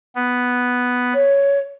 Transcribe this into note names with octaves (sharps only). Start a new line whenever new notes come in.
B3
C#5